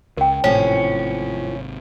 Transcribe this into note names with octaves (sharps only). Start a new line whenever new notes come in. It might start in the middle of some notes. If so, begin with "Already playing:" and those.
C#2 A#4 G5
G#1 A2 C3 F3 C#4 G#5